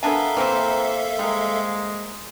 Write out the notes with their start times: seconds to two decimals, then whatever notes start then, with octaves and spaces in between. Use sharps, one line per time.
0.03 B3 D4 A4 A#4 E5 F5 G#5
0.37 E3 A#3 C4 C5
1.19 G3 G#3 A#4